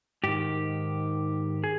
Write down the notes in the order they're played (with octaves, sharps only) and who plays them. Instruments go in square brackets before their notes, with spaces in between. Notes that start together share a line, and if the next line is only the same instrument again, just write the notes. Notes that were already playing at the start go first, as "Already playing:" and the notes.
[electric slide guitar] G#2 D#3 G4
G#4